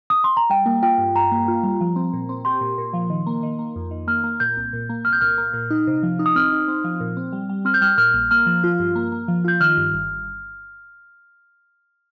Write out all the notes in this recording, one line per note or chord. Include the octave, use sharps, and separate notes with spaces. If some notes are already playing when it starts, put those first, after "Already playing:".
D#6
C6
A#5
G3 G5
A#3
F4 G5
G2
G2 A#5
A#3
F4
G3
F3
C4
A#2
C4
G4 C6
A#2
A#2
F3
D#3
A#3
D#3
A#3
F2
D#3
A#3 F6
A#3
A#2 G6
C2
A#2
A#3
C2 F6
G6
A#2 F6
A#3
A#2
D#4
C3
F3
D#4
D#6
C4 F6
D#4
C4
F3
A#2
C4
G3
G3
C4 F6
G6
G3 F6
A#2 F6
A#1
A#3 F6
F3
F4
G2
A#3
A#3
F3
F4 G6
D#3 F6
G2
G1